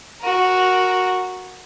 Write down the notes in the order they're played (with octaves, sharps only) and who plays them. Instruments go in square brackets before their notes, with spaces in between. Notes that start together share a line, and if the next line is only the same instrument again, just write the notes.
[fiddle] F#4 A#4